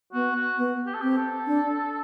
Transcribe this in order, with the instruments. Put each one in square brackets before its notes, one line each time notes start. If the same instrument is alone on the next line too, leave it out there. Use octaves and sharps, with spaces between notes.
[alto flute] B3 [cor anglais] F#4
[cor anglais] F#4
[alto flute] B3
[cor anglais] G4
A4
[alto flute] C4 [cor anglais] G4
[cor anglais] A4
[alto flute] D4